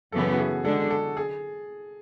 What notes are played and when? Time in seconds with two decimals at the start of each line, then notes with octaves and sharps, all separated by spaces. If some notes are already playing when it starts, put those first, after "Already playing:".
0.12 F#2 C#3 E3 B3 A4
0.32 F#4
0.39 G#4
0.64 D3 G#3 D4 A4
0.91 A4
1.17 G#4